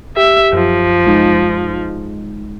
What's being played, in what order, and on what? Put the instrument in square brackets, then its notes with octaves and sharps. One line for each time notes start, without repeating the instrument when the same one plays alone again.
[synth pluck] G4 [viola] E5
[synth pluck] F#2 [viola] F3
[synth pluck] G#3 D#4